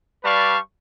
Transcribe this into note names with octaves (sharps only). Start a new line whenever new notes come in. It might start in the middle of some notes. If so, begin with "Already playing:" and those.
G3 B4 D5 F5 A5 C#6